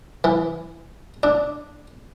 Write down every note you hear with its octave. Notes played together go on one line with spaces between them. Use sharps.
E3
D4